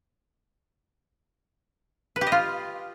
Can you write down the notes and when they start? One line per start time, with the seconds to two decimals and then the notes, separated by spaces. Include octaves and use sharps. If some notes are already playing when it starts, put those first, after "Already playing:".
2.16 B4
2.21 G4
2.27 D#5
2.32 F4